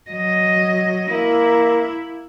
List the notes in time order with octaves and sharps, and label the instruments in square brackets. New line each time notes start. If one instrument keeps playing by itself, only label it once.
[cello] F#3 D#5
[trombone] A#3 [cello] E4